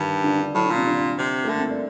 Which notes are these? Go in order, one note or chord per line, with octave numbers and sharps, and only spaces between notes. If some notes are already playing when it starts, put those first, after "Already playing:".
Already playing: G2 D#3
D3
D3
A2 F#3
D3
A#2
C3
D3
C3
A3
D3 A#3
C4
D4